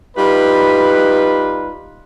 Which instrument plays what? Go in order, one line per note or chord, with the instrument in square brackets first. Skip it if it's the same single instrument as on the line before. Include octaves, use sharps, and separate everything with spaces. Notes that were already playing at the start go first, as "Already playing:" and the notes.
[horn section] G3 D#4 F4 B4